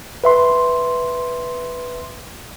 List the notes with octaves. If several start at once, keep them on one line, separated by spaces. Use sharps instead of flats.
B4 E5 C6